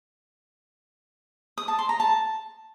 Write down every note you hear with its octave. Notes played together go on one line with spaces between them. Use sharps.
D#6
A5
C6
A#5
A5